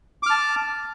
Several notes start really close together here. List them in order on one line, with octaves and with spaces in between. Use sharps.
D6 F6 A5